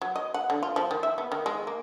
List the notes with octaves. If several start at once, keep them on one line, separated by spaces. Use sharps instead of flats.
F#3
D#5
F#5
D3
F4
F3
D#3
E5
B3
D#3
G#3
A#3